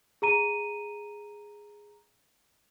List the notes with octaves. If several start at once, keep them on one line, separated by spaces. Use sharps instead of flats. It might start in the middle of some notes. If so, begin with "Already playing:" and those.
G#4 A#5 D#7